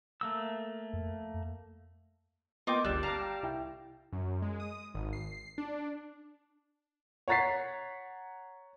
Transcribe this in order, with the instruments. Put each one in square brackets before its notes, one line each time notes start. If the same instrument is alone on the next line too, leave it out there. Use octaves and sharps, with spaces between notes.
[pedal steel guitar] A3 A#3 E6
[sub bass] F2
[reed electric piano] A#3 B3 [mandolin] F4 D6 [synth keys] D#5 G5
[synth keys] G1 C#2 [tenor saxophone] G3 [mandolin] D4 [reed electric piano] F#6 A6
[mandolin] F5 [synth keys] A5 A#5 D6
[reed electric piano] G5
C2 E4 G5
[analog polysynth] F#2
G#3
D#6
G#1
C7
D4
[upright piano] C#5 F#5 A#5 A6 B6 C7